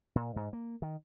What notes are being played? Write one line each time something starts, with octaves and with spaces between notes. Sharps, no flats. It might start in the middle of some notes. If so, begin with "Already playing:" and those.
A#2
G#2
A#3
D#3